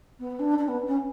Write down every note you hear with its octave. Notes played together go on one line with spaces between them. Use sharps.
B3
D4
D4
B3
C#4